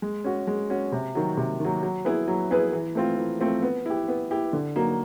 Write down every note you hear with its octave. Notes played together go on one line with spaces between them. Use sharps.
G#3
C#4 F#4
G#3
C#4 F#4
C3
D#3 F#3
C3
D#3 F#3
F#3
B3 E4 G#4 B4
F#3
B3 E4 G#4 B4
E3
A3 C4 F4
E3
A3 C4 F4
B3
E4 G4
B3
E4 G4
D3
F#3 A#3 D#4 F#4